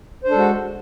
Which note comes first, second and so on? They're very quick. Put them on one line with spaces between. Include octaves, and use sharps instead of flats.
C5 D4 A4 G#3 F#4